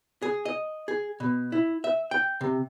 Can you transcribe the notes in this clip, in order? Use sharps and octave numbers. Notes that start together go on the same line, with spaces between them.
G#4
D#5
G#4
B2
E4
E5
G5
C3